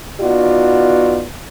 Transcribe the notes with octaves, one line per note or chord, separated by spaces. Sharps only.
B3 D#4 F4 F#4 D5